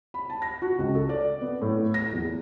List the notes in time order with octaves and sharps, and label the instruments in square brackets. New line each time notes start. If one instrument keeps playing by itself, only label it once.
[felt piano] B5
A5
A#6
F#4
C#2
A4
D5
B3
A2
A#6
E2